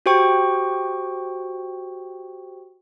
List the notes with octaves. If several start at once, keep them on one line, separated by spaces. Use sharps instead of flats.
F#4 G4 C5 G5 C#6